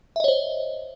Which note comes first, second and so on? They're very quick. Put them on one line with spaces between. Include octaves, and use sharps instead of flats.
E5 D#5 C#5 C5